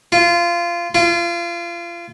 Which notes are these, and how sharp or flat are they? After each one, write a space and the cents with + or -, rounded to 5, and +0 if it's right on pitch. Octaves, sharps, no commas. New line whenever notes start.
F4 -20
F4 -30